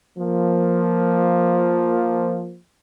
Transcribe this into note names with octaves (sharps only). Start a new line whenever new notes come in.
F3 A#3